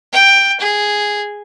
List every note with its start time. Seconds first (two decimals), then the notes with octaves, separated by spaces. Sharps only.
0.13 G5
0.60 G#4